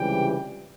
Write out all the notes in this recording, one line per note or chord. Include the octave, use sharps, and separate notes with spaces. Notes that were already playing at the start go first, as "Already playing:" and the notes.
Already playing: C#2 C3 E3 G3 G5